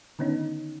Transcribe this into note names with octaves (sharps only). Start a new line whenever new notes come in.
D3 D#3 B3 C#4 D#4